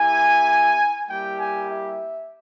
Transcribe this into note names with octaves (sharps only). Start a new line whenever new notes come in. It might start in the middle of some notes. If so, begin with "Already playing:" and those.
Already playing: A#3 E4 G4 G#5
G3 A#3 E4 G4 G5
G#5
E5